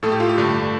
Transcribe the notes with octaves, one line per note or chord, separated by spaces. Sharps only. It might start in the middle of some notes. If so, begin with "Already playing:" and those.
A2 A3 A4
G4
F4
G4
G2 D3 A3